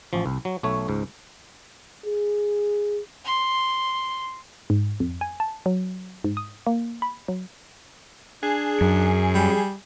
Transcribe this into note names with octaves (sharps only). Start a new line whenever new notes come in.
A1 F3
C2
F#3
B1 A3 C#5
C#2 G#2
G#4
C6
G#2
F2
G#5
A5
F#3
G#2
D#6
A#3
B5
F#3
D4 G#4
F#2
G3